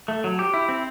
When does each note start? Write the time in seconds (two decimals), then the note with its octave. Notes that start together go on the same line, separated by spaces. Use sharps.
0.08 A3
0.24 F#3
0.39 G4
0.54 E4
0.69 C4